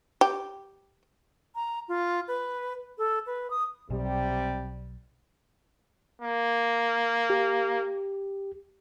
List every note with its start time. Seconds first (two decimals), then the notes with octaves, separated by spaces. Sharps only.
0.21 G4
1.55 A#5
1.88 F4
2.28 B4
2.98 A4
3.26 B4
3.50 D#6
3.90 B1 C3 G3 G4
6.22 A#3
7.30 G4